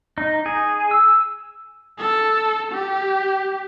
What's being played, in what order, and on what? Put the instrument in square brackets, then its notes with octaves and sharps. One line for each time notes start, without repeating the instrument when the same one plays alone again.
[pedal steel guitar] D#4
G#4
E6
[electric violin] A4
G4